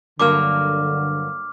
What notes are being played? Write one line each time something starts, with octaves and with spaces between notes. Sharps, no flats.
G2 D3 F#3 A#3 D6 F6